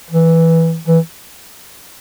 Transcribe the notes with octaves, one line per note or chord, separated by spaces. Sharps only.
E3
E3